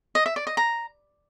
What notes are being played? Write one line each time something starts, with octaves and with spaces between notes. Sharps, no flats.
D#5
E5
D5
D#5
A#5